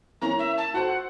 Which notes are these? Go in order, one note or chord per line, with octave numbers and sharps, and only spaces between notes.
E3 A#3 C#4 A#5
E5
A5
F#4 A4 C5 F#5